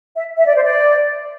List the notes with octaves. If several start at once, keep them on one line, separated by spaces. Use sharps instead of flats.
E5
E5
D5
C5
D5